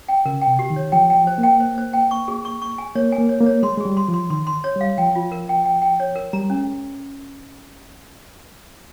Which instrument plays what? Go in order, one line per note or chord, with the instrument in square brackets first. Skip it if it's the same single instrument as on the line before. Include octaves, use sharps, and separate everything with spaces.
[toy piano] G5
[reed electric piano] C#3 [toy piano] A#4
[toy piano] G5
[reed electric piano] C3
[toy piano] G4
[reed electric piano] D#3
[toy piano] C#5
[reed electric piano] F3 [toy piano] G5
[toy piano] G5
[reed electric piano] F3
[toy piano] C5
[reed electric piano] A#3
[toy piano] G5
C5
C5
G5
C#6
G#4
C#6
C#6
G#5
[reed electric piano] A#3 [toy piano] C#5
[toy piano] G#5
[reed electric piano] A#3
[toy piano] C#5
[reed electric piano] A#3
[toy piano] C#5
[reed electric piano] G#3 [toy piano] C6
[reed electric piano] G#3
[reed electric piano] G3 [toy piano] G#4
[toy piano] C6
[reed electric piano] F3
[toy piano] C6
[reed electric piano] D#3 [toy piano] C6
[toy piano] C6
C#5
[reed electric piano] G3
[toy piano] F5
[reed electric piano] F3 [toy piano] G5
[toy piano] F4
A#4
G5
G5
G5
C#5
A#4
[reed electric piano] G3 [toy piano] A#5
[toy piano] C#4
[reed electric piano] G#3